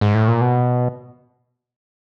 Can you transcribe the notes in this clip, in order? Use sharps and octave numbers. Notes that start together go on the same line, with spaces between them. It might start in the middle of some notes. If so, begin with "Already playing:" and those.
G#2
A2
A#2
B2